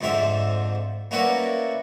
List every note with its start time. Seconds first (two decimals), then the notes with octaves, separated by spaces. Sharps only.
0.01 F2 G#2 D3 C5 E5 D6
1.11 A#3 C#4 E4 F#4 B4 D5